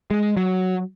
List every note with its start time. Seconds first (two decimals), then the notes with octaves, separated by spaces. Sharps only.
0.11 G#3
0.37 F#3